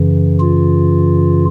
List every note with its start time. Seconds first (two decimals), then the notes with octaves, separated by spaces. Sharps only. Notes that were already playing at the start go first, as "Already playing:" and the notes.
Already playing: F#2 C#3 E3
0.40 F4